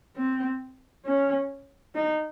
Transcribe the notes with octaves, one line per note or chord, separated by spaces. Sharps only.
C4
C#4
D#4